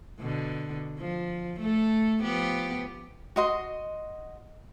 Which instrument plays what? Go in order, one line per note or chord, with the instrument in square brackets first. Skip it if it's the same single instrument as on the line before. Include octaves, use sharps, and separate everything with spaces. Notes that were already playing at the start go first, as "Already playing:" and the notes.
[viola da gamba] B2 D3
F3
A3 A4
F3 B3 G4
[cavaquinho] F#4 D#5 C6